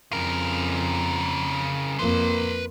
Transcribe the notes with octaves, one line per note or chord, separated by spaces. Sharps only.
F2 C#3 A#4
F2 A#3 B4 C6